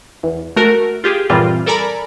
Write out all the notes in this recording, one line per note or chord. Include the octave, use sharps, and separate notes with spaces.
E2
A3 F#4 A#4
F4 G4 G#4
G2 A#2 E3 G3 C4 F4
A4 A#4 D5 G#5 A#5 B5